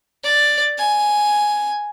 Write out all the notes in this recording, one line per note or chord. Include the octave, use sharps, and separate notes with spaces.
D5
G#5